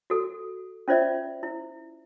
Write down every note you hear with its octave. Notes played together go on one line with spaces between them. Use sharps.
F#4 A4
C#4 F4 C5 D5 E5
E4